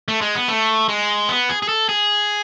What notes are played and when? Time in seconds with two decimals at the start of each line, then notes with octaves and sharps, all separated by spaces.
0.08 A3
0.21 G#3
0.35 B3
0.48 A3
0.88 G#3
1.29 B3
1.49 G#4
1.62 G#4
1.69 A4
1.89 G#4